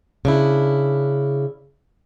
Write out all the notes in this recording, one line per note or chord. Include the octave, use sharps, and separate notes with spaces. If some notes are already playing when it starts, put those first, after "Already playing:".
C#3 D4 E4